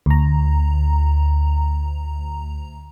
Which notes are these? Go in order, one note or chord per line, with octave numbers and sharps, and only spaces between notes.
D2 A#5